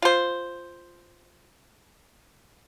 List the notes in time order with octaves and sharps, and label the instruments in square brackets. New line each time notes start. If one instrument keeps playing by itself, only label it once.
[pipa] F4 C5